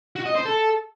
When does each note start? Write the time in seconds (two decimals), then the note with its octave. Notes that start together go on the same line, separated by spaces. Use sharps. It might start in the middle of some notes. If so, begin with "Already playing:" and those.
0.16 F#4
0.26 D#5
0.35 C5
0.45 A4